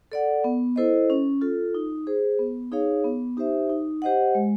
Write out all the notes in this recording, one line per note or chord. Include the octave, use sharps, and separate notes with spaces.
A4 D5 F#5
B3
E4 A4 C5 D#5
C#4
F4 A4
D#4
G#4 C5
B3
D#4 G#4 C#5 F5
B3
D#4 G4 C5 E5
D#4
G4 C5 D#5 F#5
G#3